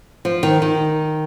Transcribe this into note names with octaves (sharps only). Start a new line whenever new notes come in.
F3
D#3
D#3